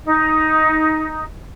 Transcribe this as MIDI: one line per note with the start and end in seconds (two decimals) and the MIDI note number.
0.05 1.22 63